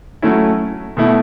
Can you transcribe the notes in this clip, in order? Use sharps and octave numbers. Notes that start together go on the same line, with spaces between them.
F#3 A3 C#4 E4
B2 A3 E4